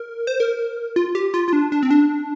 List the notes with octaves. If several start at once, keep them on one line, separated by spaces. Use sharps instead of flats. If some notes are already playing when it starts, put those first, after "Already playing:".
Already playing: A#4
C5
A#4
F4
G4
F4
F4
D4
D4
C4
D4